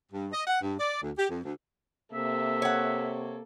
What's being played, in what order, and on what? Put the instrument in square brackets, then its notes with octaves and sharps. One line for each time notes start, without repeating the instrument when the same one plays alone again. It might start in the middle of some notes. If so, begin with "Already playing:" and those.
[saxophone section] G2
D#5
F#5
G2
D5
D2
G4
F2
D2
[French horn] C3 [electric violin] A#3 A4 [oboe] E5
[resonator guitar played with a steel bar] C#5 F#5